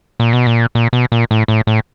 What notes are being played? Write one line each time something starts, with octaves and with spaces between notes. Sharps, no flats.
A#2
B2
A#2
A#2
B2
A#2
A2
A2
A2